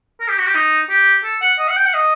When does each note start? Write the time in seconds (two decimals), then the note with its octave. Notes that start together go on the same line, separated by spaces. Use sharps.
0.20 A#4
0.29 G4
0.38 F#4
0.47 G4
0.55 D#4
0.89 G4
1.24 A4
1.42 F#5
1.59 D#5
1.69 F#5
1.77 G5
1.86 F#5
1.94 D#5